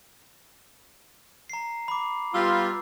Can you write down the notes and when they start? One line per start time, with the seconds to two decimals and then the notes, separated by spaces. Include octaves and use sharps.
1.50 A#5 C7
1.88 B5 D6
2.34 G3 B3 F4 E6